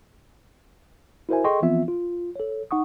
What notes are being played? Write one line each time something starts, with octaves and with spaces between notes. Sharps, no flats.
E4 F#4 A#4 C5 E5 G#5
G#4 A4 D#5 G5 C6 C#6
E3 F3 B3 C4 F4 E5
F4
A4 C#5
D#4 F#5 C#6 D#6